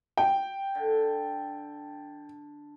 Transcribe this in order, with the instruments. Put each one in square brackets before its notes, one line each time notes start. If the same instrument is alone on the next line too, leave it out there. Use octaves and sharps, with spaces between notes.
[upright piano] G5
[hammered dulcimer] D3